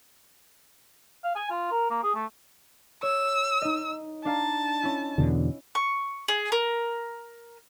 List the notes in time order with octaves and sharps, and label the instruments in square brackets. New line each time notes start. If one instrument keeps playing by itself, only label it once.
[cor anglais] F5
G#5
F4
A#4
A#3
G#4
A3
[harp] C#5 [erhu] E6
[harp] D#4 D#5
[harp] D4 F5 A#5 [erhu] A5
[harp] C#4 E4
[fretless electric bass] E2 B2 D3
[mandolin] C#6
G#4
A#4